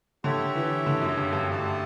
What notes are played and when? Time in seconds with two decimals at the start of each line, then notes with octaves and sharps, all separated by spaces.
0.24 D3 G4 C#5 E5 G5
0.55 E3
0.86 D3
1.01 F#2
1.17 G2
1.33 G2
1.48 A3 E4 G4 D5 A5